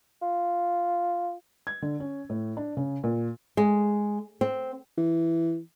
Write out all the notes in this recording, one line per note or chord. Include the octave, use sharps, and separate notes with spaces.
F4
G#6
D3
C#4
A2
D4
C#3
A#2
G#3
C4
E3